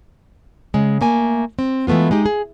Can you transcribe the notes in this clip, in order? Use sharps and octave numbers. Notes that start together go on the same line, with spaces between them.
C#3 G#3
A3 A#3 G#5
C4
E3 G#3 A3 B3 F4
G#3 D#4 G4
G#4